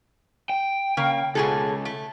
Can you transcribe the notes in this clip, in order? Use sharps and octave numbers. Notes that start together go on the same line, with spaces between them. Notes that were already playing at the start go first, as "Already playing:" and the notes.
G5
C#3 A#3
C#2 B2 G#4 A4
A3